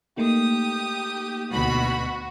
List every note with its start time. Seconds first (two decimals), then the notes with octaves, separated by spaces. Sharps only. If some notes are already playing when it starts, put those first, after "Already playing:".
0.17 A3 A#3 D#4 G4 D#6
1.51 D2 B2 F#4 B5